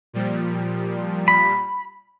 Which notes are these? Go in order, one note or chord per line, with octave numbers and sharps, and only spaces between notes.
A#2 F3 G3
B5